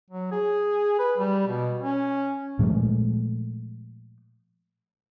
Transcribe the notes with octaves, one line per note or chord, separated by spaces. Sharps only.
F#3
G#4
B4
G3
B2
C#4
A#2 F3 G#3 A3